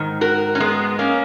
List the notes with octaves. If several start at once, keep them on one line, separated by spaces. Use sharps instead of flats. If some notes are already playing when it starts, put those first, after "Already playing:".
Already playing: G#2 D#3
F#4 A#4
C#4
G#3 B3
A#3 C#4